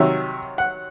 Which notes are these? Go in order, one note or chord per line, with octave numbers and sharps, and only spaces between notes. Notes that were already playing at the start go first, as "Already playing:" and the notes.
Already playing: C3 D#3 F#3 E5
F#5